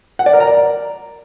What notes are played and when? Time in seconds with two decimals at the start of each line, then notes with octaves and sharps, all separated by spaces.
0.19 F#5
0.26 D5
0.33 A#4
0.40 A#5
0.47 D5